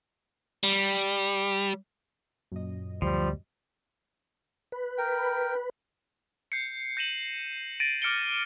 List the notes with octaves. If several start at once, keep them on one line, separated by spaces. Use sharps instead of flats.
G3
F#2 A#2 D#5
D2 F3 G3 C5
B4
A#4 G5
G6 C7 C#7
G6 A#6 D#7 E7 F#7
A6 A#6 D7 D#7
D6 F6 C#7 D7 G7